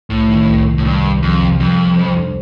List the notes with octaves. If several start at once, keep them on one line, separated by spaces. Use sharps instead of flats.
C2 A2
D#3
C2
C3
A2
C2 G2
D#3
C2 F2
C3
F2 G3
A4
C5
D4